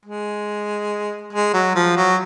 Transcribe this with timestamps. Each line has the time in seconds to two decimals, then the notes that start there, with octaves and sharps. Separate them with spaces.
0.05 G#3
1.33 G#3
1.53 F#3
1.75 F3
1.96 F#3